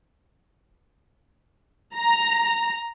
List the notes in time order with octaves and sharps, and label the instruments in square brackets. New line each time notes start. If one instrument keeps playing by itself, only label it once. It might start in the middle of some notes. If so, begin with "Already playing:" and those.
[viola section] A#5